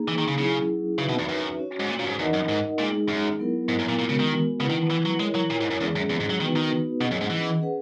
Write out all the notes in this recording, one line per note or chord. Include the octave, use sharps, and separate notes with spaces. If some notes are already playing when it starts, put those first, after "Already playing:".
Already playing: A#3 D#4 G#4
E3
D#3
C#3
C#3 F#3 C#4 E4 G#4
C#3 D#4 F#4 B4 E5
B2
E2
F#2
C#4 F#4 C#5
G#2
A#2
A#2
F#2
G#2
E2 D#4 A#4 D#5 F#5
F#2
G#2
A#2 G#3 D#4 G#4
F#2
F#3 B3 E4 A#4
G#2
F#2
A#2
A#2 G#3 B3 F#4 A#4
C#3
D#3
C#3 E4 B4 F#5
D#3
E3
F#3
G#3 E4 A#4 C#5
F#3
A#2
G#2
F#2
E2 G#3 C#4 G#4
F#2
E2
G#2
F#3
D#3 B3 D#4 F#4 B4
D#3
B2 C#4 G#4 D#5 F#5
F#2
G#2
E3
C#4 G#4 B4 F#5